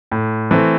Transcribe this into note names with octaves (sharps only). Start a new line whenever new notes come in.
A2
E3 A3 C4